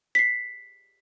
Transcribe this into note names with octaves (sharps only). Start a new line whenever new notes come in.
B6 C7